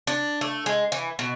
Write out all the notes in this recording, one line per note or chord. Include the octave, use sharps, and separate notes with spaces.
D4
A3
G#3
E3
B2